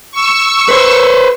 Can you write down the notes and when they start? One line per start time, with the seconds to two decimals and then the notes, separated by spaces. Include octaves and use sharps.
0.12 C#6 E6
0.68 B4 C5